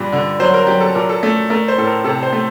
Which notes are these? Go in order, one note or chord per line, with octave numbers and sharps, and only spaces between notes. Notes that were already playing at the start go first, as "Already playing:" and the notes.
Already playing: G2 A#2
D3
F#3 C5
A#4
F#3 G4
A4
A#2 A#4
A4
A3
A3 A#4
C5
A2 A4
A#4
C3 A4
C5
A3